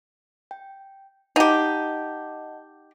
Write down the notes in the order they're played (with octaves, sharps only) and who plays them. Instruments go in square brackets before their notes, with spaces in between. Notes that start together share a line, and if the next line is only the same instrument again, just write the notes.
[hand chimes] G5
[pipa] D#4 G4 [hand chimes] D#5 F#5 A5